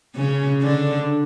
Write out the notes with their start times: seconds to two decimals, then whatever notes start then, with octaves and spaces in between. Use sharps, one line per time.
0.15 C#3 C#4
0.62 D3 D4